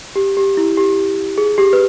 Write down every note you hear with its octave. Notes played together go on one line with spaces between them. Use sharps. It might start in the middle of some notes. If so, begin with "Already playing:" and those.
G4
G4
E4
G4
G#4
G4
B4